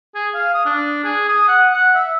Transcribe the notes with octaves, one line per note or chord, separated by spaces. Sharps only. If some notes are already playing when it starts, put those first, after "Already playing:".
G#4
F5
D#6
D4
G#4
D#6
F#5
F#5
E5